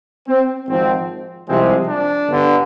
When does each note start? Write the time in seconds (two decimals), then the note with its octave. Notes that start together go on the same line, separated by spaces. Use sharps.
0.29 C4
0.68 G#1 G#2 F3 C4
1.48 C2 C3 F3 G#3 C4
1.87 D4
2.28 G1 G2 D3